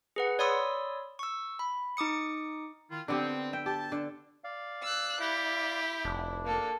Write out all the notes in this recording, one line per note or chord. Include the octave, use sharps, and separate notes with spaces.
G#4 B4 F#5
C#5 D5 B5 C6 D#6 E6
C#6 E6
B5
D#4 D6 D#6 C#7
D#3 E4 F4
D3 B3 C4 G4
E5 G5
G4 A5
D3
D5 F5
E6 F#6
E4 G4
F1 D4
A#3 A4